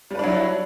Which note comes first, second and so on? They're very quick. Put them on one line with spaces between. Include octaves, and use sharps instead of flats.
G3 B4 D4 F#3 E4